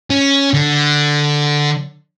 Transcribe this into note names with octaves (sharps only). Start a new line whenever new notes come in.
C#4
D3